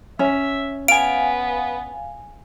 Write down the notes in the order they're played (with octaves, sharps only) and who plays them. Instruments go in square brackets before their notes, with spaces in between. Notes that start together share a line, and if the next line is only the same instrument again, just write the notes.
[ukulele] C#4 [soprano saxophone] E5
[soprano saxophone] B3 [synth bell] F5 G#5 [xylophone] D7